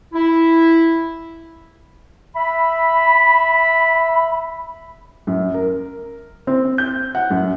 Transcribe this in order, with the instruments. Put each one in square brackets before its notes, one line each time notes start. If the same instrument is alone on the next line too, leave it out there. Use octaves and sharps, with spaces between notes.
[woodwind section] E4
E5 B5
[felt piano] F#2
A#4
C4
G6
F#5
F#2